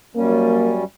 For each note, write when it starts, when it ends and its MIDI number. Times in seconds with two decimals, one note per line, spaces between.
0.15 0.84 42
0.15 0.84 55
0.15 0.78 58
0.15 0.84 61